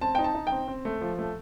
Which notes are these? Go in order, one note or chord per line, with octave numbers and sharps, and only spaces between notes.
C4 A5
D#4 G5
A5
D#4
G5
C4
C4
A3
F3
A3